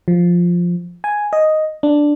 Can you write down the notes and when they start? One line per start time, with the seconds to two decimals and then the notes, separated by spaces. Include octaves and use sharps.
0.08 F3
1.04 G#5
1.33 D#5
1.83 D4